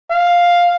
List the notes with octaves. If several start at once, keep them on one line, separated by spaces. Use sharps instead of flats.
F5